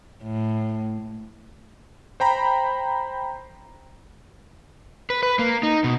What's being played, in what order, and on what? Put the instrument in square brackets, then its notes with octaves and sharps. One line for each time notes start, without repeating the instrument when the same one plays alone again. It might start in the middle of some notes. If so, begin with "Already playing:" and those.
[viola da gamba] A2
[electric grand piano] C5 G5 A#5 B5
[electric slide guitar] B4
B4
A#3
D#4
B2